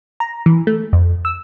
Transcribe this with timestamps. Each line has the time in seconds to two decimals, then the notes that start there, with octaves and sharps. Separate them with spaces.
0.20 A#5
0.46 E3
0.67 A3
0.93 F2
1.25 E6